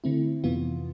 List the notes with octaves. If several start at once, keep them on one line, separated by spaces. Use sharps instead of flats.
D3 A3 C4 E4
F2 C3 E3 B3 F4